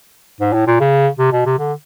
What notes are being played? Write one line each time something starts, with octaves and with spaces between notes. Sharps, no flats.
G#2
A2
A#2
C#3
C3
B2
C3
D3